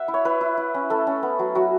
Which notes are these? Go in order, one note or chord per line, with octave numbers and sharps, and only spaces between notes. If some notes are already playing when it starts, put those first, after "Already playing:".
Already playing: E5 F#5
E4
C#5
E4 B4
E4
E4
C#4
A3 A4
C#4
B3
F#3
F#3 F#4